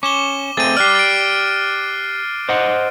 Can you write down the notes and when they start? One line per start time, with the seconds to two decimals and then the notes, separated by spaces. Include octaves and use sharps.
0.03 C#4 D6 E7 G7
0.57 A3 C4 G#4 A6 D#7
0.77 G4 D5 F6 F#6 C7
0.95 A6 D7
2.49 C5 D#5 F#5